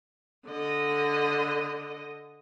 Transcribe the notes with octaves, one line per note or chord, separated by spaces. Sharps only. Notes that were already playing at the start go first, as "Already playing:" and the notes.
D3 D#5